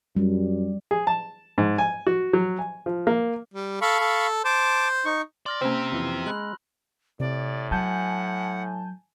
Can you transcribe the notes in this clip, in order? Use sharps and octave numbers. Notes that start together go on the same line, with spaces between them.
F#2 G3
G#4
A5
G#2
G#5
F#4
F#3
G#5
F3
A#3
G3
A4 F5 B5 C#6
A4
C5 A5 D6
D#4 C#6
D5 C6 F6 A#6
A#3 C4 C#4 G4 C5 A#5 E6
F2 E3
G#3 B5 F#6 F#7
A2 C3 D5
F#3 F#5 G#5 A5 G6